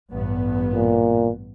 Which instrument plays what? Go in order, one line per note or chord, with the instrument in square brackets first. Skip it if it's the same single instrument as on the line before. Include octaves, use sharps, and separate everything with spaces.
[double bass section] A1 G2 B3
[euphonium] A#2